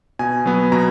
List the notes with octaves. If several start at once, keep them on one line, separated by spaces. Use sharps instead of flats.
B2 G#5
F#3 B3
B2 A#5